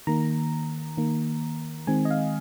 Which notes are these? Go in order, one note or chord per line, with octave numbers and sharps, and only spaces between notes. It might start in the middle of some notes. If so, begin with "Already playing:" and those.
D#3 A#3 A#5
D#3 A#3
D#3 G#3 C4 G#5
D#5
F5